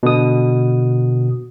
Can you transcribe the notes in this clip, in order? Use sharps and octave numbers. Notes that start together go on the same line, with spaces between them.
B2 D3 D#6